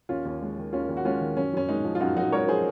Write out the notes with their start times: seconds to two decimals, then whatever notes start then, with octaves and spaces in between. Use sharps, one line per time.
0.09 D#2 C#4 F4
0.25 D#2
0.42 G#3
0.58 D#3
0.73 D#2 C#4 F4
0.89 D#2
0.97 F#4
1.05 G#3 C#4 F4
1.21 D#3
1.37 F#2 C#4
1.53 F#2 C#4
1.69 G#3 D#4
1.84 F3
1.95 F4
2.00 F#2 D#4 F#4
2.17 F#2 D#4 F#4
2.32 G#3 A#4 C#5
2.48 F3 G#4 C5